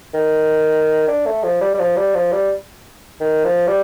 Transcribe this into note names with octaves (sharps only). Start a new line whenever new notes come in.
D#3
D4
A3
F3
G3
G3
F3
G3
F3
G3
D#3
F3
G3